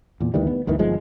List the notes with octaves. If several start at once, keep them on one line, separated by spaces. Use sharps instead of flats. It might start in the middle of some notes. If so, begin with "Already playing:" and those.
E2 A#2
D2 D#3 E3 G3
B3
G1 D2 D#3 E3
G1 F3 G#3